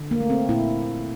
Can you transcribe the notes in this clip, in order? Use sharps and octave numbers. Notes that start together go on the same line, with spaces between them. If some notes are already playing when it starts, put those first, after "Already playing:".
Already playing: D3
A#3
A3
C4
A#2 E4